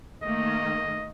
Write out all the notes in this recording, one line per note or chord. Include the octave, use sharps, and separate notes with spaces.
D#3 A3 A#3 D#5